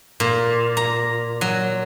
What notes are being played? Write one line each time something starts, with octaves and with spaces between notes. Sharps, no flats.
A#2
A#5
F#3